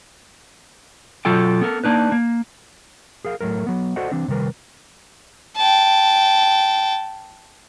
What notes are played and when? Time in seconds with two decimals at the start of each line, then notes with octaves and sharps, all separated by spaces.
1.25 B2 F#3 F4 A4 G5
1.61 B3 A4 A#4
1.84 A#3 D4 D#4 B4
2.12 A#3
3.25 G#4 A#4 F5
3.41 A2 F#3 A3 A#4
3.67 F#3 B3
3.96 F#4 A4 C5 D5 D#5 F#5
4.12 E3 C4 D4
4.28 C3 D#3 G3 A#4 B4
5.56 G5 A5